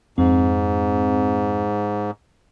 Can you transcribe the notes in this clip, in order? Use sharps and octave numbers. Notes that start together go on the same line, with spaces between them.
F2 G#2 C4